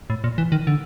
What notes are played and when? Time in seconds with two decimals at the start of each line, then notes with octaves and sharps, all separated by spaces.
0.10 A2
0.24 A#2
0.38 E3
0.52 D#3
0.67 D3